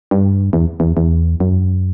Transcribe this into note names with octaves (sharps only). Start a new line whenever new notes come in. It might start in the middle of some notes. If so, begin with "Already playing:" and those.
G2
E2
E2
E2
F#2